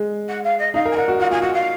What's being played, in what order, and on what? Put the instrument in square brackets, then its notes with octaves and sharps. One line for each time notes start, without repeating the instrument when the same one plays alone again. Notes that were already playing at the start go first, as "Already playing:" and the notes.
Already playing: [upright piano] G#3
[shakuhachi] F#5
F5
D#5
[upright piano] D#4 [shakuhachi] F5
[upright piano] A#4
[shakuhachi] G#5
[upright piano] A#4 [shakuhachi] F#5
[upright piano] F#4
[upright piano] F4 [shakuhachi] F#5
[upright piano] F4 [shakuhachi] G#5
[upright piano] F#4 [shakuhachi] F#5
[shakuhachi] F5